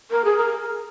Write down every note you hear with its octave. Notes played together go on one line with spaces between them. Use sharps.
A#4
G#4
A#4